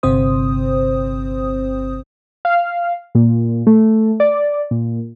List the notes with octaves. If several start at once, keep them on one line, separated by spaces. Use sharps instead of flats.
G1 C3 C4 C5 D#6
F5
A#2
A3
D5
A#2